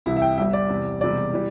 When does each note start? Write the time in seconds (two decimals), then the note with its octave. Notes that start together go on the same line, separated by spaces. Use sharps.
0.06 C2 C3 E3 E4
0.17 E5
0.22 G5
0.37 G1 G2 G3 E5
0.53 D5
0.69 E2 C3 G3
1.01 E1 E2 C3 G3 D5
1.33 E3 G3